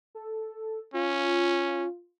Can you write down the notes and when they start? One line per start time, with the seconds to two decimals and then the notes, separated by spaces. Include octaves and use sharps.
0.15 A4
0.94 C#4 F4